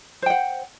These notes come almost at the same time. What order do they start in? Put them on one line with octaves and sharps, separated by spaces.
C5 G5 F#5